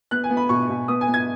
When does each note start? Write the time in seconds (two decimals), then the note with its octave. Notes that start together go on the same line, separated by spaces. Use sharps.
0.11 B3 F#6
0.24 G#5
0.30 B3
0.37 B5
0.49 B2 C#6
0.69 B2
0.88 B3 D#6
1.01 G#5
1.08 B3
1.14 G#6